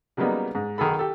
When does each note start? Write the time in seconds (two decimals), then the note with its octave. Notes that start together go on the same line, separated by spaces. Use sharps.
0.17 C#3 F#3 G3 A#3 B3 D#4
0.55 G#2
0.78 B1 D#3 G#4 A4 B5
0.99 G4 A4